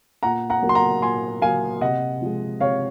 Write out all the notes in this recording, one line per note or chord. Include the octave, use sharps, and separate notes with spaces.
A#2 F#5 A#5
F#5 A#5
F#3 A#3
C6
F#5 A#5
A#2 G#5 C6
F#3 A#3 F5 G#5
C3 D#5 F#5
F3 G#3
C3 C#5 F5